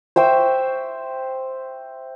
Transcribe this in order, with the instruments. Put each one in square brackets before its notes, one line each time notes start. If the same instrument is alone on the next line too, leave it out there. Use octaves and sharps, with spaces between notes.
[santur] C5 E5 G5 C#6